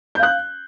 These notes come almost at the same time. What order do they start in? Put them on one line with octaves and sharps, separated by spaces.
G6 F5 F#6